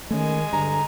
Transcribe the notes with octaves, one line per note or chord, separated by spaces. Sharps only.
D#3 G#3 A3 C#4 G#5
G2 D3 A#5